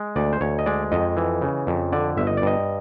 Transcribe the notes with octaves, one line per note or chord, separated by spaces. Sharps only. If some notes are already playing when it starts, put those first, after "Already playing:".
Already playing: G#3
D2 D5
C5
D2 C#5
D#5
G#3 D5
F2 D#5
E3
C#3
F2
D3 D5
G1 E5
D#5
D5
G2 D#5